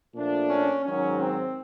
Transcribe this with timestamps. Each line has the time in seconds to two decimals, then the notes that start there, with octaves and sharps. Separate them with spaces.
0.14 A#2 F3 A3 D4
0.49 C#4
0.84 G#2 D#3 F#3 C#4
1.21 C4